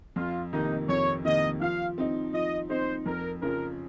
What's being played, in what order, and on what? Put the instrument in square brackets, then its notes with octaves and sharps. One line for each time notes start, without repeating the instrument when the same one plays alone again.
[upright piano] F2 [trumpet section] F4
[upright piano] C3 D#3 A#3 [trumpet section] D#4
[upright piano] F2 [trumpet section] C#5
[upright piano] C3 D#3 A#3 [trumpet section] D#5
[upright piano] F3 [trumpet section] F5
[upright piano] C4 D#4
[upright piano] F3 [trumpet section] D#5
[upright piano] C4 D#4 [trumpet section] C5
[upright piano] F2 [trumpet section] A#4
[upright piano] C#3 F3 [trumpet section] A#4